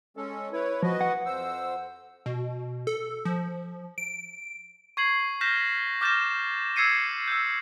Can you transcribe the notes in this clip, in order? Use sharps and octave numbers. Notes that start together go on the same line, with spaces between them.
G#3 C#4 A4
E4 B4 C#5
F3 F#4 B4 D#5
F#5
F2 C5 E6
B2
A4
F3
D7
C#6 G#6 C7 F#7
F6 G6 A#6 B6 E7
D6 F6 G6 A6 A#6 E7
E6 G#6 A6 C7 C#7 D#7
E6 G6